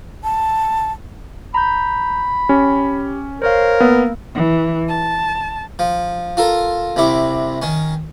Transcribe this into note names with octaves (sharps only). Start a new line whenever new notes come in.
A5
A#5 B5 G6
C#4 G4
A#4 C5 C#5 F5
A#3 B3
E3
A5
F3
F4 A4 A#4
C2 C3 E4 D6
D#3 C#4